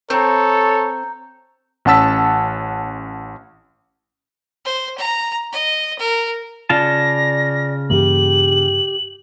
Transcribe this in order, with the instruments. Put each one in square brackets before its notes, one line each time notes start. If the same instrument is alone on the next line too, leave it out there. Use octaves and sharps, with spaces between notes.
[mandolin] C4 [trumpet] A4 [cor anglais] C#5 [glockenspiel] A#5 G6
[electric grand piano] A1 C#4 F#5 A5 E6 B6
[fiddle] C5
A#5
D#5
A#4
[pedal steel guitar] C#3 F4 A5 [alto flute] D5 [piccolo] A#6
[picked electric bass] G2 E3 A#3 [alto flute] G4 [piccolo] F#7